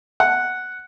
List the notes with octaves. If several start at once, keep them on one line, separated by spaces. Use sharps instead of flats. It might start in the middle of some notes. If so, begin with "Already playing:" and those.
F#5